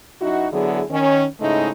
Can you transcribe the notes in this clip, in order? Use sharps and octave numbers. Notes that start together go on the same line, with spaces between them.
F#2 D#4 E4 F#4
D3 F#3 B3 E4 G#4
D#3 C#4
G#2 C#3 G#3 A3 D#4 E4